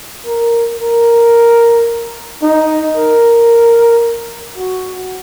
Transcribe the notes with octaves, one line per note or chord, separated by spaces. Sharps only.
A#4
A#4
D#4
A#4
F#4